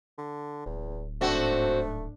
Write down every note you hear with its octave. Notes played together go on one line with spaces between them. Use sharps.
D3
D1 E2
G#2 A3 C4 D4 F#4